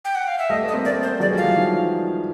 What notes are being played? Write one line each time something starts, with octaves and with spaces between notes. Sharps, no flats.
G5
F#5
F5
E5
G3 A3 D#5
A3 B3
D#5
A#3 C4
A3 B3 D5
C5
F#3 G#3 D5
F3 G3
F5
E3 F#3
D#3 F3